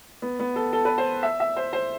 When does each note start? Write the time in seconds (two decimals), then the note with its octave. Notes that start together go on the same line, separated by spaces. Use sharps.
0.22 B3
0.39 B3
0.56 A4
0.73 A4
0.85 B4
0.98 C5
1.23 E5
1.40 E5
1.57 C5
1.73 C5